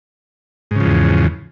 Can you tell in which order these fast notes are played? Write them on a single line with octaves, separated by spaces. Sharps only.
G#2 C#3 F3 E2